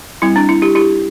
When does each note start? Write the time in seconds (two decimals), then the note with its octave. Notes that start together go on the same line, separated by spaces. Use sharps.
0.22 G3 C4 E4
0.36 D4
0.49 E4
0.62 E4 G4
0.75 E4 G4